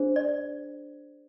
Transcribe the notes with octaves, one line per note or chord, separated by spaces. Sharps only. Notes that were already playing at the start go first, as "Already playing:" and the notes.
Already playing: D4 G#4 C5
D5